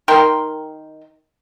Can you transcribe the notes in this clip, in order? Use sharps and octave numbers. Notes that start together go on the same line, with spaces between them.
D#3 A#4 G5 C6